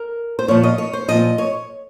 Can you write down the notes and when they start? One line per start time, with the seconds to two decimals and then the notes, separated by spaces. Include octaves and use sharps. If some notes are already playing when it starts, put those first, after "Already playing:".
Already playing: A#4
0.39 C5
0.48 A#2 F3 C#5
0.64 D#5
0.78 C#5
0.93 C5
1.08 A#2 F3 D#5
1.38 C#5